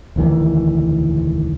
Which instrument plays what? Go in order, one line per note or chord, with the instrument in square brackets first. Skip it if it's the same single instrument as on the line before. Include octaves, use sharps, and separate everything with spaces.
[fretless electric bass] E1 D2 D#3 E3